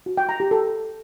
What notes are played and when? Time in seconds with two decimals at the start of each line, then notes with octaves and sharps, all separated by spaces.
0.06 F#4
0.18 G5
0.29 A#5
0.40 G4
0.51 A4